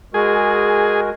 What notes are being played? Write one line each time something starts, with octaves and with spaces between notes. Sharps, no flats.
G#3 F#4 G#4 A#4